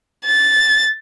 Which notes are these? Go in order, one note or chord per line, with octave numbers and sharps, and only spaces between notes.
A6